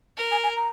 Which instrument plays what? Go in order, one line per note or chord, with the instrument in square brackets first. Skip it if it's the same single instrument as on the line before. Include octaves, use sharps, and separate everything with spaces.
[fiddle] A#4
[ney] G#5
G#5
A#5